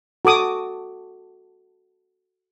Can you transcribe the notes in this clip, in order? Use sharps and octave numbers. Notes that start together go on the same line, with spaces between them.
F#4 A4 D6 D#6